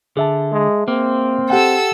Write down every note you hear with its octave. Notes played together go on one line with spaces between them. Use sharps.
D3 G#4 E5 A5
G#3
A#3 C4
G4 A4 F#5 G5 E6